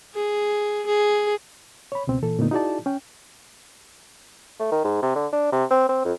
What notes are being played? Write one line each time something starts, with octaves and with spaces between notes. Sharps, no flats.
G#4
G#4
C#5 B5
C#2 B2 C4
A#2 E3 A4
F2 A#2 D3 A3 B3 D#4
D#4 E4 F#4 G#4 D5 A5
C#4 G5
A3
D#3
G#2
C3
D3
D4
C3
C4
C4
F2